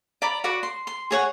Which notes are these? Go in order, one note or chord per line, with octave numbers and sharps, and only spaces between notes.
D5 A#5 B5 D6
F#4 D5 F#5 B5
C6
C6
G#4 C#5 F#5